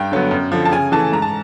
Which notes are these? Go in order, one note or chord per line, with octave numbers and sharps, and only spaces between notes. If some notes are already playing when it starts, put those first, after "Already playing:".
Already playing: G2 G5
D3 F#3 B3
F#2
D3 F3
A5
C#3 G#5
E3 A3 A5
G#2 A#5
A5